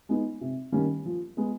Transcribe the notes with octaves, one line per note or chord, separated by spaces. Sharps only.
G#3 B3 D#4
C3
D#3 G3 A#3 C#4
F3
G#3 B3